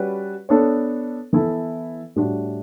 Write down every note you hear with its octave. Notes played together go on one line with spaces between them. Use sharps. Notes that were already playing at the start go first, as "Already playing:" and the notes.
Already playing: G3 C#4 F#4 B4 D5
B3 D4 A4 C#5
E3 B3 E4 A4
A2 G3 D4 F#4